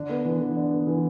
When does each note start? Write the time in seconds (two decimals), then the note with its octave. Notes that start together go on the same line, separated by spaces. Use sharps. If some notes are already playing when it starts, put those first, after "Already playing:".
Already playing: D3 D4
0.09 B3
0.25 E3
0.40 E3
0.57 D4
0.72 B3
0.87 E3